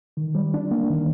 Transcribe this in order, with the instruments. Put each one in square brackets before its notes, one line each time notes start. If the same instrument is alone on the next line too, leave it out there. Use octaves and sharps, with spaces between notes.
[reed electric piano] D#3
G3
D4
A#3
D#3